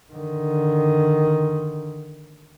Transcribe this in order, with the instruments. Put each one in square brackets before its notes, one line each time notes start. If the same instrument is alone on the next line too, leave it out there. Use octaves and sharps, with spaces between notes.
[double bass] D3 D#3